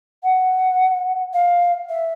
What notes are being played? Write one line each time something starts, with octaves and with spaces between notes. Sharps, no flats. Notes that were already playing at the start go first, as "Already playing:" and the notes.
F#5
F5
E5